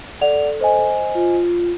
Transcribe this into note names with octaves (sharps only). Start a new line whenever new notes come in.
A4 D5 F#5 F7
C5 D#5 G#5
F4